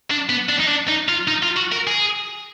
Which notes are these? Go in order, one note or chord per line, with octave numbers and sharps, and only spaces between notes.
D4
B3
D4
D#4
D4
D#4
F4
D#4
F4
F#4
A#4
G#4